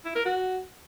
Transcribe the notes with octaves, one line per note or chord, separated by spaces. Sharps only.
E4
A#4
F#4